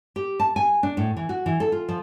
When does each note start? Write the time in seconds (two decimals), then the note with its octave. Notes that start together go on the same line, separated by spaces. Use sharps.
0.16 G4
0.40 A5
0.56 G#5
0.83 D4
0.97 A2
1.17 E3
1.29 F#4
1.46 E3
1.60 A4
1.72 F4
1.89 F3